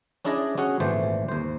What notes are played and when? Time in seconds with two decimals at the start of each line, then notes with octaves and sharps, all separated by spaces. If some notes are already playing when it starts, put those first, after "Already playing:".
0.25 C#4 D4 E4 G#4 D5 D#5
0.58 C#4 F#4 G#4 F#5
0.80 G#1 A#2 E3 A3 C5 D5
1.29 D#2 C5